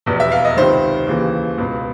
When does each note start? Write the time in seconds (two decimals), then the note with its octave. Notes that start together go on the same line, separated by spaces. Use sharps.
0.06 F1 E2 B2
0.20 E5
0.32 F5
0.45 D#5
0.56 C#2 C3 D#3 C5
1.07 D#2 C#3 E3
1.58 C#2 B2